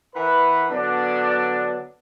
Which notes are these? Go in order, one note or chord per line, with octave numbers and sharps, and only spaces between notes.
E3 A#4 B4 F#5 B5
D3 F#3 B3 D4